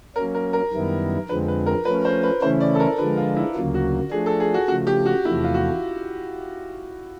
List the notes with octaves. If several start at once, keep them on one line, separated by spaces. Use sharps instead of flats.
F#3 A#3 C#4 A#4
A#4
A#4
F#2 D#3 G3 B3 E4
F2 D3 F3 G#3 C4 B4
B4
A#4
F3 A3 C#4 B4
C5
B4
C#3 E3 A3 C#4 E4 C5
D5
A4
A#4
D3 F3 G#3 B4
F4
E4
D2 C#3 F#3 A#3 F4
F#4
F3 A3 D4 G#4
A4
G#4
F#4
C#3 F3 A3 F#4
G4
F#4
E2 C3 F3 A3 E4
F4
F#4